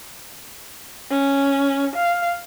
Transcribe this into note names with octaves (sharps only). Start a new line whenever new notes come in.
C#4
F5